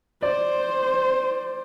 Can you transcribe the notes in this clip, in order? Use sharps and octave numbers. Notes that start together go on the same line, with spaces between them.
C5 D5